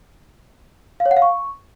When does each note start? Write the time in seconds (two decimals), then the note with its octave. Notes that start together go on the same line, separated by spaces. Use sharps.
1.00 F5
1.06 C#5
1.11 F#5
1.17 F5
1.22 C#6